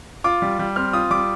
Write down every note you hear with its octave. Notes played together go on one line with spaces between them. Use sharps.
F4 D6
G3
G3
C4 F6
F4 D#6
G3 D6